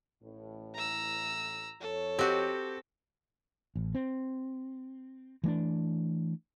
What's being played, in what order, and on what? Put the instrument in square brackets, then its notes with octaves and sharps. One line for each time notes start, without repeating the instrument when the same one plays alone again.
[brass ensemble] A1 A2
[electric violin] A#5 E6
[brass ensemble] F2 C#5 [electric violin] A4
[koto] C4 F#4 [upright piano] G4
[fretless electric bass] A1
C4
E3 A3 A#3 D4